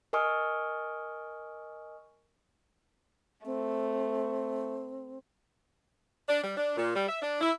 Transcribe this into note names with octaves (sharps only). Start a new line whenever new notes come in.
A#4 D#5 G#5 C#6 D#6 F6
A3 C4
D4
G3
D4
A#2
G3
E5
D4
E4